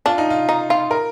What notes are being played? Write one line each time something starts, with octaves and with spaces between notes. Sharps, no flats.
D4 F4
D#4
F4
D#4
F4
A#4